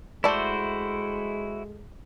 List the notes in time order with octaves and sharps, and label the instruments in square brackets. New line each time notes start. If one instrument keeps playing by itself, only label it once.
[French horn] G#3 [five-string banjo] A3 D5 [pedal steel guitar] E4 F#4 C5